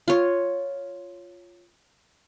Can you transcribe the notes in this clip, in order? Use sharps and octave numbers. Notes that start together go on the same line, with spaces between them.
F4 C#5